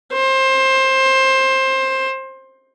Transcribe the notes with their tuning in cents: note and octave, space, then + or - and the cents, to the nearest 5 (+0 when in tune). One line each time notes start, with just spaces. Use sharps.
C5 +20